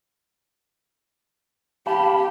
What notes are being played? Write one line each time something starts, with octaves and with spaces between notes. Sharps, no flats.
G4 F5 A5 B5